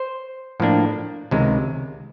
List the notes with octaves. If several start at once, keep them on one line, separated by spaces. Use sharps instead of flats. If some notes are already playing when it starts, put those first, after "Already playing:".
Already playing: C5
A2 F3 A#3 D4
C#2 C3 D#3 G#3